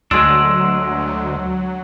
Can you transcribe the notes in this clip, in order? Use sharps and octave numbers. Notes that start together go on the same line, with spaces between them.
D2 F#3 G#3 D4 C6 E6